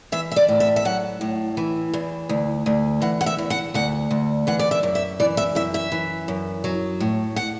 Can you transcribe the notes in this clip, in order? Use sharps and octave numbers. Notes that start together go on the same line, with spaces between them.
E3 E5
E5
D5
A2
E5
E5
F#3 F#5
A2
E3
E2
D2
D2
E3 F#5
F#5
E5
E2
F#5
D2 F#5
D2
E3 F#5
D5
E5
F#2
E5
E3 D5
E5
F#2 E5
E5
E3
F#2
F#3
A2
F#5